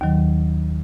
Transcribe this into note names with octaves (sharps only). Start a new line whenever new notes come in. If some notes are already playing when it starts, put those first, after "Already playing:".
D#2 D#3 F#3